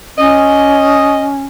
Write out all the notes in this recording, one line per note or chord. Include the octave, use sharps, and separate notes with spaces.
C#4 D#5